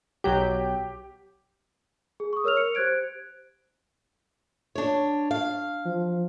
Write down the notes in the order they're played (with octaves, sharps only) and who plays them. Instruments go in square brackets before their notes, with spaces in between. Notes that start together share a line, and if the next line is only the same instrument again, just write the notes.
[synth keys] B1 F#3 G6 [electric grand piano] G4
[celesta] G#4
C#6 D#6
A#4 C#5 E6 F6 F7
C#7
G4 C5 F#6 G#6 D7
[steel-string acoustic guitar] D4 C#5
F5
[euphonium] F3